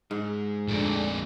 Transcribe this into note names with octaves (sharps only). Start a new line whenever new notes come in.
G#2 G#3 D#4
F2 A#2 A3 D4